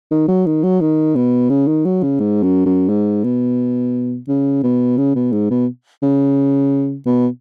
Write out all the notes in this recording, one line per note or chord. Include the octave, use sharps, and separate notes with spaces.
D#3
F#3
D#3
F#3
D#3
B2
C#3
D#3
F#3
C#3
G#2
F#2
F#2
G#2
B2
C#3
B2
C#3
B2
G#2
B2
C#3
B2